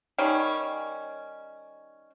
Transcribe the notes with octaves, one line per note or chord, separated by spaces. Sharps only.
D#3 G3 C#4